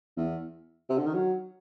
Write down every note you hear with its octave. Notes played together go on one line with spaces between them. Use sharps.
E2
C3
D3
D#3
F#3